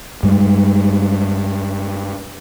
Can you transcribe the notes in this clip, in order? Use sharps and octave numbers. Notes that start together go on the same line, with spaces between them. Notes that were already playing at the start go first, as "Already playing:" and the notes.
G2 G3 G#3